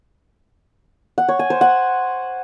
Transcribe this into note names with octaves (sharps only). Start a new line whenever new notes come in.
F#5
C#5
G#5
C5
F#5